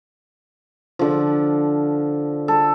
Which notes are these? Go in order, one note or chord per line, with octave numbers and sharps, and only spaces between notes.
D3 F3
A4